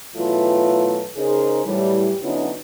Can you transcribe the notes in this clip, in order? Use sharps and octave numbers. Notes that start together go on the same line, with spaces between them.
B2 E3 F#3 A3 F4 B4
C#3 D#4 G#4 A#4 C5
A2 E3 F#3 G3
D3 F#3 B3 C#4 D#4 E4